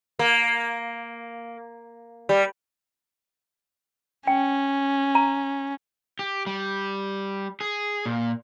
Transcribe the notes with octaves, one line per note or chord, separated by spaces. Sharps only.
A#3
G3
C#4 G5
A#5
G4
G3
G#4
A#2